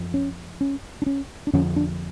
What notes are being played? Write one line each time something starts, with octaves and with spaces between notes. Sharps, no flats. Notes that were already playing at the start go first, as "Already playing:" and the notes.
Already playing: F#2 F3
C#4
C#4
D4
C#4
D4
F2 D3 F3 C#4
D4